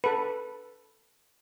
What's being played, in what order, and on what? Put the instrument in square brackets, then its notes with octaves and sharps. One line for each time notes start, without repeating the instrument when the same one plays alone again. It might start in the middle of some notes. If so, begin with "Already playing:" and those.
[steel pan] A4 B4